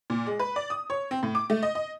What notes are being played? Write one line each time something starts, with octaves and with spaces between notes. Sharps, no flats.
A#2
G#3
B4
D5
D#6
C#5
C4
A2
D6
A3
D#5
D#5